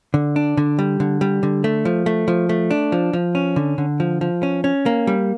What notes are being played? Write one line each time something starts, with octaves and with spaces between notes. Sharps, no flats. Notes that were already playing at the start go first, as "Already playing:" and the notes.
D3
D4
D3
G3
D3
G3
D3
A3
F3
A3
F3
A3
D4
F3
F3
C#4
D3
D3
F3
F3
C#4
C#4
A#3
G3